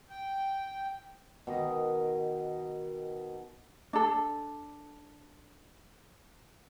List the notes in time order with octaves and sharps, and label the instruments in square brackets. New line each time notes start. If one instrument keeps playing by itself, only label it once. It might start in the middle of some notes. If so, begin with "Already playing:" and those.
[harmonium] G5
[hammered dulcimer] B2 D#3 D#5
[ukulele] D4 A4